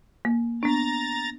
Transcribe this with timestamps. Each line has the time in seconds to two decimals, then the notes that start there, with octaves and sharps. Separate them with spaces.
0.25 A#3
0.63 B3 D4 A#5 A6